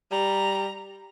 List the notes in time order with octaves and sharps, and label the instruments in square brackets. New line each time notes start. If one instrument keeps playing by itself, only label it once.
[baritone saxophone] G3 [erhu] A#5